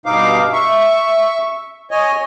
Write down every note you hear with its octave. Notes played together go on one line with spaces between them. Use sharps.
G2 B2 D#4 F5 D6
E5 C#6
C#5 D#5 G#5